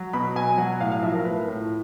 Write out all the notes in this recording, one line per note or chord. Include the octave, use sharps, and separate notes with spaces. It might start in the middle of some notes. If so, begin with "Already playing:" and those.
Already playing: F#3
B2 B5
B2 G#5
F#3 F#5
A2 F5
F5
F3 E5
A#4
A2 B4
A2